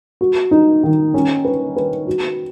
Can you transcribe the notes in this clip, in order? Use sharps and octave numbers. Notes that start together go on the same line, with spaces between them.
F#4
D#4
D#3
C#4
B4
B4
F#4